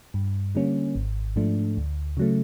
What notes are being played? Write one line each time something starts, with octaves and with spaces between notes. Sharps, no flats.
G2
D3 G3 A#3 C#4
G#1
G#2 F3 A3 D4
D2
C#3 F#3 A3